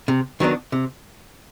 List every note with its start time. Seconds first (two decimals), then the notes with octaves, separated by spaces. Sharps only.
0.08 C3
0.40 D#3 F#3 B3 D4
0.72 C3